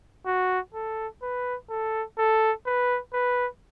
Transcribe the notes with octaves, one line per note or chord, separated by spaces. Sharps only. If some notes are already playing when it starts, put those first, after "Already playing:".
F#4
A4
B4
A4
A4
B4
B4